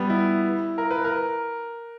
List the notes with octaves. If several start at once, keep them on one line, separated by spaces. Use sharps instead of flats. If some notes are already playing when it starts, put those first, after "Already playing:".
Already playing: G3 B3
E4
A#4
B4
A#4